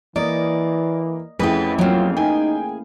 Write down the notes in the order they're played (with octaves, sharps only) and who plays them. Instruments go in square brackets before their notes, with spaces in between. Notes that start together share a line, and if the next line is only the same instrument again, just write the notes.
[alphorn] E3 [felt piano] A#3 [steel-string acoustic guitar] D5 [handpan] D#5
[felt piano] F2 G#4 G5 [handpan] A3 C#4 E4 [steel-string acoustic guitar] B3 B4
[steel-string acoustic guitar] F#3 C4 [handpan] A#3 F5 [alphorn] F4
[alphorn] D#4 [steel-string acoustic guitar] G#4 [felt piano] G5 G#5